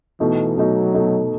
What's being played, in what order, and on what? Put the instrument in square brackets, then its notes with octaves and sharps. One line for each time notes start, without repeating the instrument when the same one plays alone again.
[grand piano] B2 A3 D#4 [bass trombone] E3
[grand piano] B2 A3 D#4 [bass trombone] F#3
[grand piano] B2 A3 D#4